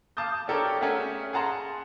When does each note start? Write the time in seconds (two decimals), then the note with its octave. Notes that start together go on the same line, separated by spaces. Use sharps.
0.17 F5 A5 D6 D#6 G6
0.48 D4 G4 A4 A#4 C#5 D5
0.81 A3 C#4 G#4 A#4 E5 F#5
1.33 G#4 F#5 A5 A#5 C6